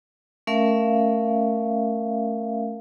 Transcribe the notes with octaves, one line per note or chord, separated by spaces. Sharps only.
A3 C#4 A#4 E5 F5